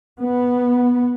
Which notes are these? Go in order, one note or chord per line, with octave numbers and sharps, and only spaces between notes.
B3